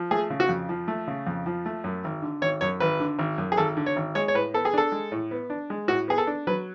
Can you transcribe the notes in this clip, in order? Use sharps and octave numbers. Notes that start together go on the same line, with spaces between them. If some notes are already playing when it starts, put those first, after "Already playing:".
Already playing: F3
A3 G#4
C#3
F#4
F2
F3
A3
C#3
F2
F3
A3
F#2
G#1
D3
G#1 C#5
F#2 C#5
G#1 B4
D3
G#1
F#2
G#4
G#1 A4
D3
C#5
G#1
G#3 C#5
C#5
A2 B4
B3 A4
G#4
D4 A4
G#3
A2
B3
D4
G#3
A2 F#4
B3 G#4
A4
D4
F#3 B4